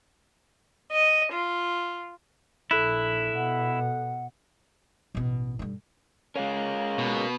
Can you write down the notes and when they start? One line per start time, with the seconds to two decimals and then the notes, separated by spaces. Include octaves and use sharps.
0.91 D#5
1.31 F4
2.71 A#1 E4 A4 F#6
3.34 B2 F#5
5.15 A1 B2
5.59 G2 D3
6.36 G#3 C#4 A#4 F5
6.98 B2